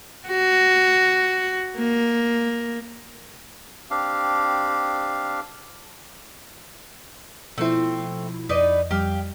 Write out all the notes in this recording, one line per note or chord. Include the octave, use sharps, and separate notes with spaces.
F#4
A#3
C4 D4 G4 F5
B2 F3 A3 C4 E4
F2 D#4 B4 D5
F2 G3 G4 F5